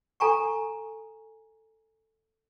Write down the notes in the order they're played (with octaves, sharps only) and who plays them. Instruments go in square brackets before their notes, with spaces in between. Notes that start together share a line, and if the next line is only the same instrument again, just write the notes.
[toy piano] A4 G#5 A#5 C#6